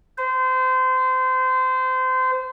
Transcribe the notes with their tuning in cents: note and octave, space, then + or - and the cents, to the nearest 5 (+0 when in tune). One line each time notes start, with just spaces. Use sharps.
C5 -25